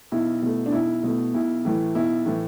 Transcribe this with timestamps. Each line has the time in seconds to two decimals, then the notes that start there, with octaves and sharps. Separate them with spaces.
0.12 B1 E4
0.42 B2 A3
0.66 D4
0.72 B1 E4
1.03 B2 A3
1.34 B1 E4
1.65 A2 E3 A3
1.95 B1 E4
2.26 A2 E3 A3